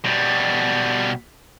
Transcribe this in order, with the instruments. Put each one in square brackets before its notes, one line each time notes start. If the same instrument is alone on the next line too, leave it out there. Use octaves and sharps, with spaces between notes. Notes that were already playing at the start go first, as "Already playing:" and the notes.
[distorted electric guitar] B2 G3